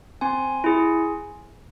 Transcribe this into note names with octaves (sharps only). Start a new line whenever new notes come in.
C4 G#5 C6
E4 G#4